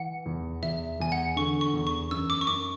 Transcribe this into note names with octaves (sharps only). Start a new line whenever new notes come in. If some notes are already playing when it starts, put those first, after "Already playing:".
Already playing: E3 F#5
E2
E2 E5
E2 G#5
F#5
D3 C#6
C#6
E2
C#6
F#2 E6
D6
C#6
F#2 D6